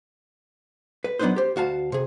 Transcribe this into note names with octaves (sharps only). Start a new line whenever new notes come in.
B4
F#3 B3 D4 D#4 B4 C5
G4 C5
D2 F#4 F5 A5
C3 G#4